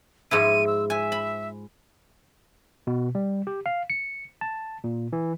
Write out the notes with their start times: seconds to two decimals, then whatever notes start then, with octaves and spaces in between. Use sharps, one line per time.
0.31 G#2 F3 E4 D#7
0.67 E6
0.90 E5 G#5
1.12 B5
2.87 B2
3.15 G3
3.47 G4
3.66 F5
3.90 C#7
4.41 A5
4.84 A#2
5.13 E3